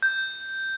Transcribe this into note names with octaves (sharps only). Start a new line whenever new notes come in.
G6